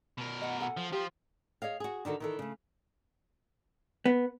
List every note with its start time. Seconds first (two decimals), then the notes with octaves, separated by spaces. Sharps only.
0.18 B2 A#4
0.42 D#5 F#5
0.61 A4 F#5 G#5
0.77 F3
0.92 F3 F4 G4
1.62 G#4 C#5 D#5 F5
1.80 F#4 G#4
2.05 D3 D#3 F#4 A4
2.20 D#3 E3 A4
2.39 C#3 A3
4.06 B3